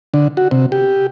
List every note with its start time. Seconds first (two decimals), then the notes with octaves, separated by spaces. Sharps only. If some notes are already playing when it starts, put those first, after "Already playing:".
0.14 D3
0.37 F#4
0.51 C3
0.72 G4